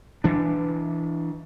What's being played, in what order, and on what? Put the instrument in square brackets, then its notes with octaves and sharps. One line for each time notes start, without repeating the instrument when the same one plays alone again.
[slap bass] E3 D4